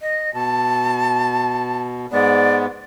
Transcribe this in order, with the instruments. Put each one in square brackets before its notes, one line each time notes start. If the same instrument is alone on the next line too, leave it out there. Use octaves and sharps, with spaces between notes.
[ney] D#5
[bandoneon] B2 [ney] A5
[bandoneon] G#2 G#3 B3 [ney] D5